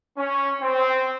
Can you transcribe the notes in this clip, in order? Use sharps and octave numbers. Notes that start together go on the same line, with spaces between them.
C#4
C4